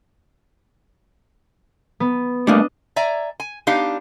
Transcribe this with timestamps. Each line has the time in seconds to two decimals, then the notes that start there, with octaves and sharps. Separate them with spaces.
2.00 B3
2.47 G3 A3 A#3 D4 D#5
2.96 D5 E5 G#5 A#5
3.40 G#5
3.67 B3 D4 D#4 G4 F5